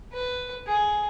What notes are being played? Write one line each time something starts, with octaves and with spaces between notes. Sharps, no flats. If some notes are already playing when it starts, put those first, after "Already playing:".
B4
G#4